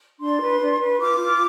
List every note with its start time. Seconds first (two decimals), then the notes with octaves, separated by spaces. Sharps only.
0.19 D4 C6
0.40 B4
0.61 D4
0.80 B4
1.01 F4 D6
1.21 F4